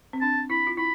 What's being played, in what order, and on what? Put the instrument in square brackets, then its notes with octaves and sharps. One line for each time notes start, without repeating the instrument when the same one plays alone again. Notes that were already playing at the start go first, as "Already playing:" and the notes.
[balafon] C4
[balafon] D4 [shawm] A5
[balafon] E4 [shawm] B5
[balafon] F4
[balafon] E4 [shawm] B5